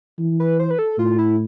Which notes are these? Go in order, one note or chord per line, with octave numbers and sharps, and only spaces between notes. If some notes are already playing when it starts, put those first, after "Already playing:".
E3
B4
C5
B4
A4
A2 F4
E4